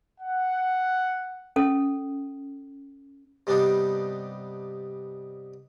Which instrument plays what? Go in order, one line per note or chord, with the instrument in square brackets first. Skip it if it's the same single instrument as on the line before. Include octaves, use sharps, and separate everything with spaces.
[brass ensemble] F#5
[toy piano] C#4 A4
[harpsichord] G2 C3 G3 B3 D4 D#4